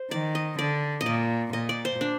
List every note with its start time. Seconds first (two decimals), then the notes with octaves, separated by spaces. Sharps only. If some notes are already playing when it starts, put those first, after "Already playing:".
Already playing: C5
0.11 D#3 D5
0.35 D#5
0.59 D3 D5
1.01 D#5
1.06 A#2 D5
1.53 A#2 D#5
1.69 D5
1.85 C5
2.01 D4